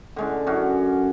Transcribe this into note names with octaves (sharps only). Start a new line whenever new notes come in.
D3 G#3 C#4
F#2 C#4 F#4